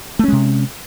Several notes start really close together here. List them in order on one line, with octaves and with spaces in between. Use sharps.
A3 C#4 G#3 C3